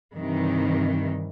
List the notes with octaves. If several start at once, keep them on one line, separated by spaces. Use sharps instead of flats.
G2 C3 D#3 E3